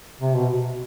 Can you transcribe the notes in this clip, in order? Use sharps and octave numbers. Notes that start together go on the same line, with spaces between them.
C3
B2